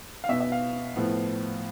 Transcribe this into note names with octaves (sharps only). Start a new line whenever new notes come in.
F5
B2 B3 E5
E5
F5
A2 F3 B3